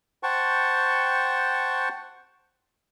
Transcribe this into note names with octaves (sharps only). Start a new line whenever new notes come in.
C5 F#5 G5 A5 C#6